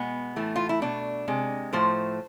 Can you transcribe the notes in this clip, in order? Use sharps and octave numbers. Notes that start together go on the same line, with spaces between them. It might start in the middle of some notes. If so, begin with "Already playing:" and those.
Already playing: B2 G#3 B3
A2 E3 A3
F4
E4
B2 A3 D4
C3 G#3
A2 F3 A3 C5